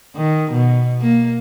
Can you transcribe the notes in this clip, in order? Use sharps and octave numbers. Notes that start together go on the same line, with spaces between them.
D#3
B2
A#3